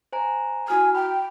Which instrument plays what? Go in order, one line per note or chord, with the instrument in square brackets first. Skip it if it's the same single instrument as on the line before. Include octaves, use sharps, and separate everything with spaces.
[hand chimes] C5 G#5 A#5
[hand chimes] E4 F#4 F6 [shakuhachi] G#5
[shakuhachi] G5 [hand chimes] B5